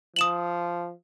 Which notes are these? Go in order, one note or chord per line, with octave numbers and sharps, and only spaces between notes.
F3 D#6 E7 F#7